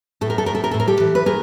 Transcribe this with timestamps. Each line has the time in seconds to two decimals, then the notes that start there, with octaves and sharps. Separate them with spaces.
0.21 A2 A4
0.30 A#4
0.38 A4
0.46 A2 A#4
0.55 A4
0.64 A#4
0.71 A2 A4
0.80 A#4
0.88 G4 A4
1.00 E3
1.15 B4
1.26 D#3 G#4 A#4